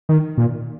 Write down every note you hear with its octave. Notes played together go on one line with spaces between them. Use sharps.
D#3
A#2